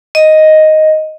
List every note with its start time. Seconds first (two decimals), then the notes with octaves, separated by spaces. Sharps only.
0.15 D#5